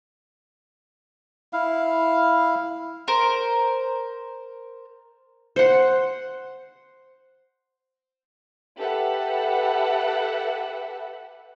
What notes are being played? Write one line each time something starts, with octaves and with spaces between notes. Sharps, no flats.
E4 F5
A#4 C5
C5 F#5
G4 A4 B4 E5 F#5